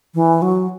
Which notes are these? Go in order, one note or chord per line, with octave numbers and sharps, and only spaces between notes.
E3
F#3